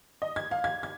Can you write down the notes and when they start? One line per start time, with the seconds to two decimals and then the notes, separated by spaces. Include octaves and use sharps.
0.22 D#5
0.36 G#6
0.51 F5
0.64 G#6
0.83 G#6